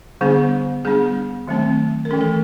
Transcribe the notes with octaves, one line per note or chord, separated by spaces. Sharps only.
D3 G3 B3 D4 G#4
G3 B3 D4 G#4
D#3 F#3 A3 C4
A#4
E3 A3 C#4 A4
A4